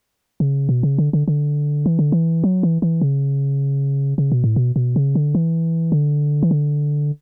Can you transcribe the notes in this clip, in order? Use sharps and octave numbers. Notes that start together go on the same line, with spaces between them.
C#3
B2
C#3
D3
D3
D3
E3
D3
E3
F#3
E3
E3
C#3
C#3
B2
A2
B2
B2
C#3
D3
E3
D3
E3
D3